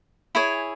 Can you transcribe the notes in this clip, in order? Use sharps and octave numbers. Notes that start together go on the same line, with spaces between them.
E4 G#4 C#5 G#5